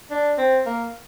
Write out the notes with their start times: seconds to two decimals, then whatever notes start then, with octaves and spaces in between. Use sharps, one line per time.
0.11 D4
0.38 C4
0.66 A#3